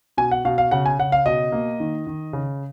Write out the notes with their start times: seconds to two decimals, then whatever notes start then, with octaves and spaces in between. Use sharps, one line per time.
0.17 B2 G#5
0.31 F#5
0.45 B2 F5
0.58 F5
0.71 C#3 F#5
0.86 G#5
0.99 C#3 F#5
1.12 F5
1.26 B2 D#5
1.52 A#3
1.80 D#3
2.07 D#3
2.33 C#3